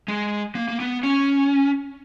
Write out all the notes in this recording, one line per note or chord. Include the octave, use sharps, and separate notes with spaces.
G#3
A#3
A#3
B3
C#4